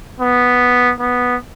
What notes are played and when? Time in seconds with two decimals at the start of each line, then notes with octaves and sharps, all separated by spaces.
0.20 B3
1.00 B3